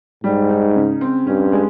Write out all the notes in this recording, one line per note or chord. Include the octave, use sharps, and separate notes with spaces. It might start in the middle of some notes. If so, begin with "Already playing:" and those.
G#2 G3
D#4
C#3
C4
G2 C#4
G#3